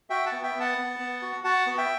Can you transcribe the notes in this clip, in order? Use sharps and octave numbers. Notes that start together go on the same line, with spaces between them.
F#4 E5 G5
F#5 A5
B3
E5 G5
B3
F#5 A5
B3
B3
F#4
F#4 F#5 A5
B3
E5 G5